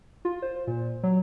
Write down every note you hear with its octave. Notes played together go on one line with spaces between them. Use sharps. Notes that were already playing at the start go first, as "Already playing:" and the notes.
F4
C5
A#2
F#3